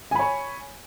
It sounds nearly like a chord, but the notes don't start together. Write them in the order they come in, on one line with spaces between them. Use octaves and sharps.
G#5 B5 C#5